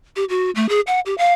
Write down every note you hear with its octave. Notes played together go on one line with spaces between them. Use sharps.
G4
F#4
A3
G#4
F#5
G4
F5